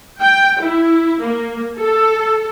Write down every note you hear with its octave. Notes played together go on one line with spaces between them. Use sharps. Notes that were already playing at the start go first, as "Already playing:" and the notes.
G5
E4
A#3
A4